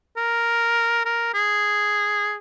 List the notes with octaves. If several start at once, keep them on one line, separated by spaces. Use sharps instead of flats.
A#4
A#4
G#4